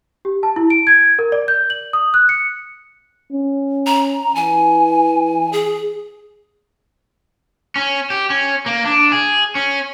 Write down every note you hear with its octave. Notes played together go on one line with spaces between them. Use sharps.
G4
A5
E4
D7
G#6
A#4
D5
G6
F#7
D#6
F#6
C#7
C#4
A#5
E3 G#5
G#4
C#4
G4
C#4
A#3
D4
G#4
C#4